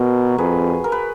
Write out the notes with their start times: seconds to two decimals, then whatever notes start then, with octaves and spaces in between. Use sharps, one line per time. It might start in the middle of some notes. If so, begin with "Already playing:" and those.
Already playing: B2 F#4 A#4
0.38 F2 G#4 B4
0.84 A#4
0.92 B4